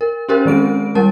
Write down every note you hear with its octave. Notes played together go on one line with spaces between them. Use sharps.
A#4
C#4 G4 A#4 C5
D#3 G#3 C4 D7
G3 A#4 A5